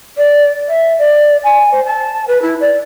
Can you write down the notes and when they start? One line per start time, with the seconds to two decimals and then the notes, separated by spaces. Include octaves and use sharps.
0.17 D5
0.68 E5
0.98 D5
1.43 G#5
1.71 C5
1.85 A5
2.27 B4
2.41 E4
2.60 D5